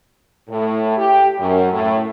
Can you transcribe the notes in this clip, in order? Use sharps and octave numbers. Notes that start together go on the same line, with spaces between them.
A2
G4
F#2
A2